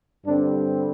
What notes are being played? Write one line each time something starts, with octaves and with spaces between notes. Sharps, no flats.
G2 D3 G3 C4 D4